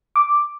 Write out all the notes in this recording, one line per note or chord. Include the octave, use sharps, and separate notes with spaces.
D6